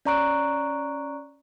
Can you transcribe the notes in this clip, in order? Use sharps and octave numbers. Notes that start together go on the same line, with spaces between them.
C#4 D5 A#5 C#6 F#6 D7